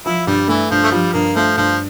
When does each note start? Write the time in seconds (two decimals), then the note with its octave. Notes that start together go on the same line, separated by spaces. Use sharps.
0.05 F3 E4
0.27 G2 G3
0.48 E3 A3
0.71 G2 F3
0.83 A3
0.91 F3 G3
1.13 G2 A#3
1.35 F3 A3
1.57 G2 F3